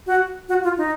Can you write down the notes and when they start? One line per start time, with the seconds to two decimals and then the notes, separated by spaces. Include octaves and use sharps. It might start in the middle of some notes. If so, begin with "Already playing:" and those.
0.07 F#4
0.49 F#4
0.64 F4
0.78 D#4